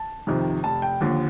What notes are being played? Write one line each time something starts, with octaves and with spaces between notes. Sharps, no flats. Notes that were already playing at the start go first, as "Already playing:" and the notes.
Already playing: A5
F2 C3 D#3
F1 A5
G5
D#2 D3 F3